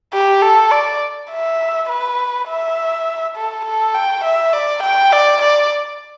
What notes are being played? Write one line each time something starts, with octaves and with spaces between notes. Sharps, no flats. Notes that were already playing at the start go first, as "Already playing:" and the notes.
G4
A4
D5
E5
B4
E5
A4
A4
G5
E5
D5
G5
D5
D5